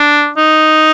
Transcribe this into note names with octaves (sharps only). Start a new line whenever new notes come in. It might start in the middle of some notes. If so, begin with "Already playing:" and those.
Already playing: D4
D#4